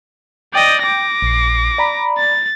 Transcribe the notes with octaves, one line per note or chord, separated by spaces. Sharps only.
D5 D#5 G5 G6
D6 A#6
A#1 C7
D5 A#5 B5
A6